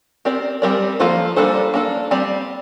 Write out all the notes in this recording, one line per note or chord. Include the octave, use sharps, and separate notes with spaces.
C4 G4 A#4 D5
G3 C4 G4 A#4 D5
F3 A#3 F4 A4 C5
G3 A#3 D4 A4 C5
A#3 D4 A4
G3 C4 G4 D5